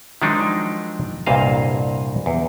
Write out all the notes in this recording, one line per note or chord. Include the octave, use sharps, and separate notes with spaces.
D#3 F3 F#3 G#3 D4 D#4
C2 G2 A#2 C5 D#5 F5
E2